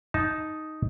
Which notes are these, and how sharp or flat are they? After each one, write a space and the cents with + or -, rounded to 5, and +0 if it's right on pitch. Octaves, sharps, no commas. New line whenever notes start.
D#4 +0 A5 -15